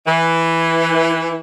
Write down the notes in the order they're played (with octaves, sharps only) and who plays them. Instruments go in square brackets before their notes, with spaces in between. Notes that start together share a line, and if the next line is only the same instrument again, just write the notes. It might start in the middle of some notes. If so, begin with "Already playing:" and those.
[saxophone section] E3